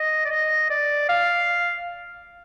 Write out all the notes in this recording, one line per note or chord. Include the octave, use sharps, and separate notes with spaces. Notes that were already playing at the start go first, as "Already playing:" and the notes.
Already playing: D#5
D5
D#5
D5
F5